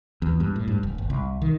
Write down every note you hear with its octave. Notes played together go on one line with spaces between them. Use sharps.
E2
G2
A2
G2
F1
G1
C2
D#3